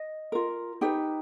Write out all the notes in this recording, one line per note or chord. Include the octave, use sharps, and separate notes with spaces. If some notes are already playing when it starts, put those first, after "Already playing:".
Already playing: D#5
F4 A#4
D#4 G4 B4 G5